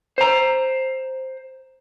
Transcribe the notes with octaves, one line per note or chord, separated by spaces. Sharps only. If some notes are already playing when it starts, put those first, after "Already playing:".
C5 A#5